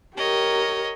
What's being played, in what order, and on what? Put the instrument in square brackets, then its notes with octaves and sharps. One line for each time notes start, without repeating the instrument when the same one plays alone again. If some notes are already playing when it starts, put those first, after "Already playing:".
[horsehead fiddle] G4 A#4 [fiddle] C#5 D#5